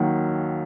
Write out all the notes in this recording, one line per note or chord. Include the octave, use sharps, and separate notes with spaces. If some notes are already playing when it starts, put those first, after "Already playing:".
Already playing: D#2 D#3 F#3